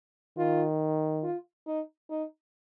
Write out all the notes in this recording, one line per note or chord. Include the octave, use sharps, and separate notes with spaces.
D#3 F4
F4
D#4
D#4